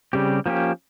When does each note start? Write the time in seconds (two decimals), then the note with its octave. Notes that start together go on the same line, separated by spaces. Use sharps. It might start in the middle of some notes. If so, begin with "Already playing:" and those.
0.13 C#3 G3 C4 G4
0.46 F3 A#3 C#4 G4